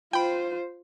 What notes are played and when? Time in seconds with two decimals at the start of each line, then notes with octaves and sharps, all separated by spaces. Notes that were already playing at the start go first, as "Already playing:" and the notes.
0.13 F4 C5 G5 B5